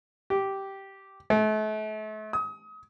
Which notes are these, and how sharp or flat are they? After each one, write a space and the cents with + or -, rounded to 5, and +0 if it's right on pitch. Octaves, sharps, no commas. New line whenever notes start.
G4 -10
A3 -35
D#6 +30